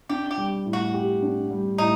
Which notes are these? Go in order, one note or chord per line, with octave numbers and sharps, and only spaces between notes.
D4 G4
G4
G3
A2
F#4
G4
D4
G3
A2 D#4